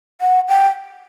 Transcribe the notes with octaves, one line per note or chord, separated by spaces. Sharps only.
F#5
G5